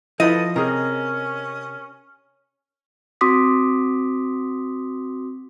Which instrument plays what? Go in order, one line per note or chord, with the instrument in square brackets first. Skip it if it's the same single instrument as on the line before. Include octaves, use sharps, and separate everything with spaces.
[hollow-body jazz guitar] F3 [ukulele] E4 B4 B5 [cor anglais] A4 [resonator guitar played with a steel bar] D#5
[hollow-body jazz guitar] C3 [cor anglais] C#4 [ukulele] G#4 A#4
[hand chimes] C4 F#4 C6 D6 D#6 B6